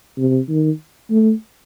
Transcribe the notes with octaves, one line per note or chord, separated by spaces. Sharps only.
C3
D#3
A3